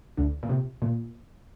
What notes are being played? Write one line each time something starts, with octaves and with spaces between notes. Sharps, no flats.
D2 D3
A#2
C3
A#2